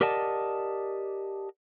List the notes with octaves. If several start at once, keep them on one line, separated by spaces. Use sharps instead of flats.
G4 A#4 D5 D#5 F#5 A5